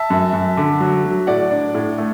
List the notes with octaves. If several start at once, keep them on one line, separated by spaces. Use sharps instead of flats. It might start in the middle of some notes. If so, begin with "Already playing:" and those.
Already playing: E5 A5
F#2
F#2
D3
F#3
F#3
A2 D5 F#5
D4
A2
A3